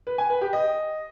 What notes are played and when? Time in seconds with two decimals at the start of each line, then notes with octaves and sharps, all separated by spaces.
0.07 B4
0.18 G#5
0.30 B4
0.41 G4
0.53 D#5